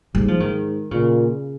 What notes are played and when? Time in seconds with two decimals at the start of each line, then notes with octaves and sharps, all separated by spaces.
0.15 G#2 G3
0.28 F3
0.40 D#3
0.91 A#2 C#3